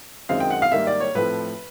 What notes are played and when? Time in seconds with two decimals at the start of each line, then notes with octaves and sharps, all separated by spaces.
0.29 F#2 D#3 G#3 C4 F5
0.40 G5
0.50 F#5
0.62 F5
0.72 G#2 D#3 G3 A#3 E5
0.87 D5
1.00 C#5
1.15 A2 F3 A3 C4 B4